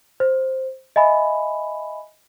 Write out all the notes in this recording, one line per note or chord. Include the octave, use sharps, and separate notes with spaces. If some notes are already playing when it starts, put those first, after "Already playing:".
C5
D#5 E5 G#5 B5